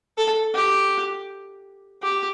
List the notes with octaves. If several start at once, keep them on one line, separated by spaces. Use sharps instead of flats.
A4
G4
G4